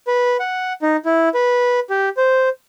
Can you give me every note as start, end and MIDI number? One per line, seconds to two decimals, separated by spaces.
0.07 0.37 71
0.40 0.73 78
0.82 0.97 63
1.05 1.29 64
1.34 1.80 71
1.90 2.09 67
2.17 2.49 72